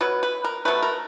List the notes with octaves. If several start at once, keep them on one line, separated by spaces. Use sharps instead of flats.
B2 F#3 B4
B4
A#4
B2 F#3 A3 B4
A#4